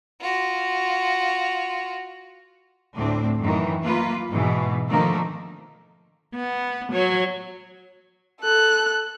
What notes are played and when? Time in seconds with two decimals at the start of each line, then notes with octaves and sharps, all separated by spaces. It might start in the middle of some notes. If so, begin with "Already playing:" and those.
0.21 F4 F#4
2.96 D2 A2 C4 D4
3.40 F#2 D#3 E3
3.82 A#3 F4 B4
4.31 G#2 B2 E3
4.89 D3 D#3 F3 A3 A#3 A#4
6.35 B3
6.92 F#3 C#5
8.41 A4 F#6